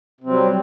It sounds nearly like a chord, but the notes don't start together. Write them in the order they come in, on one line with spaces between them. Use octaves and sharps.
C3 C4 F#3 G3